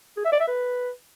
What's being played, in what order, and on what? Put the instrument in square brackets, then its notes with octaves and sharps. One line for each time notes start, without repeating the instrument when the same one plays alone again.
[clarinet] G#4
E5
D5
E5
B4